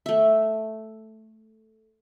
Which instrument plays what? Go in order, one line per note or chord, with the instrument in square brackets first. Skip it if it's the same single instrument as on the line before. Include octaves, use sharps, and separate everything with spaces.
[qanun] A3 E5